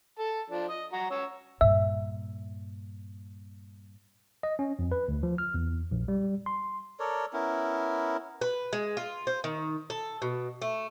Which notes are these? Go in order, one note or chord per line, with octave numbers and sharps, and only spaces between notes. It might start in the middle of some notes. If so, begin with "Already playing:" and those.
A4 A5
F3 D4
D#5
F#4 A#5
C#4 C#5 E6
G2 A#2 E5
D#5
C#4
F2
B4
D2
F3
F6
E2
A#1
G3
C6
A4 A#4 C#5 D5
B3 C#4 E4 A#4
B4
G#3
F4
C5
D#3
A4
B2
A3